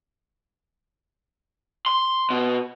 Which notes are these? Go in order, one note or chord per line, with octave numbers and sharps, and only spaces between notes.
C6
B2